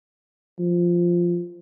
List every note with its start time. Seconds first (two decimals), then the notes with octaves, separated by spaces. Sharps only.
0.59 F3